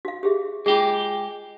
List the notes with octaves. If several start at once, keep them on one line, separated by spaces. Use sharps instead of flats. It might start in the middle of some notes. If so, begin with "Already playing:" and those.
F#4 F5
G4 G#4 E5
G#3 F4 G4 G#4